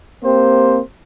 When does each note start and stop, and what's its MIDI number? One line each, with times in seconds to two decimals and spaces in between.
0.24 0.79 58
0.24 0.79 60
0.24 0.79 67
0.24 0.79 72